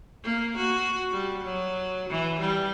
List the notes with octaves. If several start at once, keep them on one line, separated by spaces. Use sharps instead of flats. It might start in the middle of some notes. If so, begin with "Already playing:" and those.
A#3
F#4
G3
F#3
E3
G3